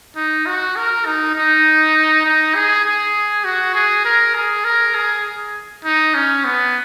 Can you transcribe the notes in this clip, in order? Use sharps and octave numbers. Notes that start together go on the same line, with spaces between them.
D#4
F#4
A#4
D#4
D#4
D#4
G#4
G#4
F#4
G#4
A#4
G#4
A#4
G#4
D#4
C#4
B3